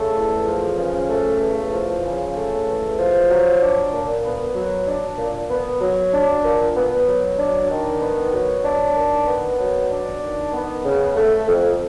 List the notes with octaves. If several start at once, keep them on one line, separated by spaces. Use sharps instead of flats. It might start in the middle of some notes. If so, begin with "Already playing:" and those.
Already playing: C#3 A3
E2
F3
C#3
A3
E2
F3
C#3
A3
E2
F3
F#3
D4
A#2
B3
F#3
D4
A#2
B3
F#3
D4
A#2
B3
F#3
D4
D#3
B3
F#3
D4
D#3
B3
F#3
D4
D#3
B3
C#3
A3
F2